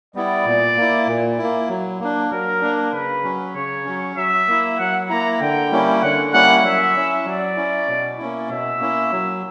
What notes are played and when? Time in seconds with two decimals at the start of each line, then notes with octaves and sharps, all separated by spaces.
0.15 G3 B3 E4 D5
0.45 A#2
0.77 A#3 E4
1.08 A#2
1.38 E4
1.43 A#3
1.69 F#3
2.00 A#3 D4
2.31 F#3 A#4
2.61 A#3 D4
2.92 C#3 B4
3.24 F#3 C#4
3.55 C#3 C#5
3.85 F#3 C#4
4.16 F#3 E5
4.47 A#3 E4
4.79 F#3 F#5
5.09 A#3 E4 A#5
5.41 D3 G5
5.71 G3 A#3 C#4 E4
6.02 D3 F#5
6.33 G3 A#3 C#4 E4 F#5
6.64 F#3 E5
6.95 C#4 E4
7.25 F#3 D5
7.56 C#4 E4
7.88 B2
8.18 A#3 C#4 E4
8.49 B2 E5
8.80 A#3 C#4 E4
9.11 F#3